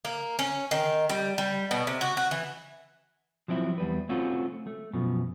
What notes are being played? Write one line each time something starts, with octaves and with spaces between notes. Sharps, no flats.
A#3
C#4
D#3
G3
G3
B2
C3
F#4
F#4
E3
F3 F#3 C4 E4
E2 G3 B4
A3 C4 C#4 F4 F#4
A3
F#2 B2 F3